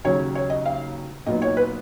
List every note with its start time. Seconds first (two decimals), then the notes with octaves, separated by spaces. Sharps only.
0.04 D#2 C#3 F#3 C#4 C#5
0.35 C#5
0.50 D#5
0.66 F5
1.26 A#2 F#3 B3 D#4 D#5
1.42 C#5
1.57 B4